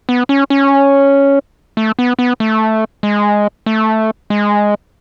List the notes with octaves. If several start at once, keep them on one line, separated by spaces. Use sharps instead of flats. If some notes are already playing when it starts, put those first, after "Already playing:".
B3
C#4
C#4
A3
B3
B3
A3
G#3
A3
G#3